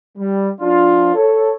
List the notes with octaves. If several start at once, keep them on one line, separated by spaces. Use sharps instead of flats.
G3
F3 D4 F4
A4 C#5